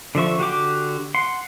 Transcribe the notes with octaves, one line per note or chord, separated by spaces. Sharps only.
D3 F3 E5 C#6
D3 F#4 G4 D6
F#5 C6